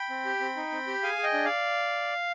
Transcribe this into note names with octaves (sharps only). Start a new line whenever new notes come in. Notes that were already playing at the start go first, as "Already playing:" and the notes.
Already playing: G5 B5
C4
G4
C4
D#4
C4
G4
G#4 F5 G#5
G#4
D#5 G5
D4
D5 F5